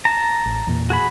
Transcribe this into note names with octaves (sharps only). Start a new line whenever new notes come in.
A5 A#5
A1
E2 A#2
F#4 G#4 B5